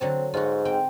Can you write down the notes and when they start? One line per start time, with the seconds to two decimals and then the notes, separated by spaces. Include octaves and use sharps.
0.01 D3 F#3 C4 A5
0.34 G#2 F4 F#4
0.65 C4 G5